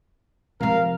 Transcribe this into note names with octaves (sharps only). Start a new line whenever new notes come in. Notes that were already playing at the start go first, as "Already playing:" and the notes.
C3 F3 A#4 F5